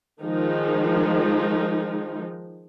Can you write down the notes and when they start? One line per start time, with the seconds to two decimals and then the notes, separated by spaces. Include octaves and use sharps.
0.22 D#3 F3 G#3 D#4